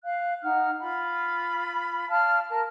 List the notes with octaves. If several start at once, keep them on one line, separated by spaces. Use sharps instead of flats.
F5 F#6
D#4 F#5 F6
F4 B5
D5 F5 A5 F6
A#4 A5